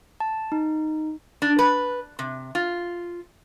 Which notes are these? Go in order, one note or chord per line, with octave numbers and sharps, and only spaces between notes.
A5
D#4
D4
B4
C3
F4